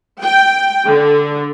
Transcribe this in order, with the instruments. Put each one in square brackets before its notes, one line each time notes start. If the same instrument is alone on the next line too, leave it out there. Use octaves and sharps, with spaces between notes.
[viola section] G5
D3